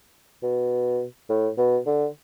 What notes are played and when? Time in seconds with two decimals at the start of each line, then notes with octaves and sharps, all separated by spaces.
0.43 B2
1.29 A2
1.58 B2
1.86 D3